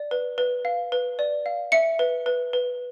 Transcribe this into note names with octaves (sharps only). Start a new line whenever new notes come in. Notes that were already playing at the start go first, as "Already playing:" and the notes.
Already playing: D5
B4
B4
F5
B4
D5
F5
E5 C#7
B4
B4
B4